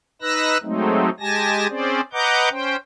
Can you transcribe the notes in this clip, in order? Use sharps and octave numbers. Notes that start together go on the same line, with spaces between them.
D#4 B4 E6 F#6 A#6
F#3 G#3 A3 C4 D#4
G#3 G4 G#5 A5 A#6
C4 C#4 G#4 C5 D5
B4 D#5 F#5 A#5 D6 G6
C#4 C5 G5